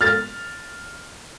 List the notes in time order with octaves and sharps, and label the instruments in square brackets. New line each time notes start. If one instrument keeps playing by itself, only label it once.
[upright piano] F6 A6